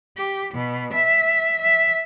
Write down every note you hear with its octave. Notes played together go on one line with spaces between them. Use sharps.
G4
B2
E5
E5